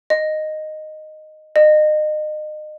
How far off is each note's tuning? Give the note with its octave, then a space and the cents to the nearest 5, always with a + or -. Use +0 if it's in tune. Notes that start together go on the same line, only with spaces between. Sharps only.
D#5 -10
D#5 -30